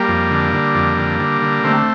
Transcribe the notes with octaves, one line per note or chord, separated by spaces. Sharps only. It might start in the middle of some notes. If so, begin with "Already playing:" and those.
Already playing: G3 A#3
F2
D3
D3
F2
D3
D3
D3
D3 A3 C4